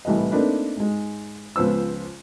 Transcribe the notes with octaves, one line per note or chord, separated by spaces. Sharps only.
C2 A2 E3 B4 D#5
A3 A#3 C4 D4 D#4 B4
G#2 G#3
C#2 F3 B3 C5 E6